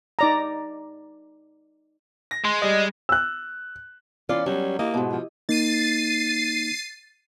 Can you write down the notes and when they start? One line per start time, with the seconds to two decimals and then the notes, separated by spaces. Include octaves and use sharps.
0.19 D#4 D5 A#5
2.31 A#6
2.45 G#3 C6
2.62 G3 D#5
3.09 E6 F#6
4.29 E3 C#4 F4 D5 F5
4.46 F#3 G3 C#4 G4
4.79 A#3 E4 G4 D#5
4.94 G#2 B2
5.12 F3
5.49 A#3 D#4 A6 C7 D#7